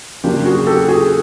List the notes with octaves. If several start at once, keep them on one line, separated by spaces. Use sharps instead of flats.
C#3 F#3 A#3 D4 F4 G4
F#4 G#4
G4 A4
F#4 G#4